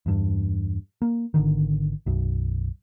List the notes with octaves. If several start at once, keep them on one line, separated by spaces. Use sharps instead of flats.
E2 G2
A#3
G#1 D3 D#3
B1 F#2